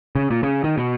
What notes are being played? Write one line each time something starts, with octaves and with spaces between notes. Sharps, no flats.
C#3
A#2
C#3
D#3
B2